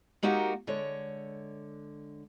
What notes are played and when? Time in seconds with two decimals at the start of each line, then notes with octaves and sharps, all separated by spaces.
0.23 G#3 A#3 D#4 F#4 G4 A#4
0.67 D3 G#3 C#5